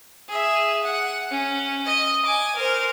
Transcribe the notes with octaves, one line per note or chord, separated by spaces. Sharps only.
G#4 E5
F#5
C#4
D#5
G#5 D6
A#4 C5